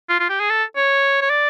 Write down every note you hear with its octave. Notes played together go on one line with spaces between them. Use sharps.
F4
F4
G4
G#4
A4
C#5
C#5
D5